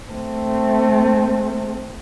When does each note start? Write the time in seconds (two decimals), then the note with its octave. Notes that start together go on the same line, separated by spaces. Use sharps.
0.11 A3 C4